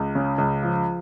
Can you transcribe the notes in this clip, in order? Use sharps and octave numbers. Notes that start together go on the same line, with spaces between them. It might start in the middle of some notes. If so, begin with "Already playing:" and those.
Already playing: C#2
C#3
C#2
F3